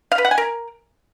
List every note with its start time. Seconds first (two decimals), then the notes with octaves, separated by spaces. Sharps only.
0.12 F5
0.18 B4
0.25 F#5
0.31 G#5
0.38 A#4